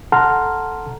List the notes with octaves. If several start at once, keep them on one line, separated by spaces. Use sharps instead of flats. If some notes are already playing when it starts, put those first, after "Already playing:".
A4 F#5 A5 A#5 C6 F6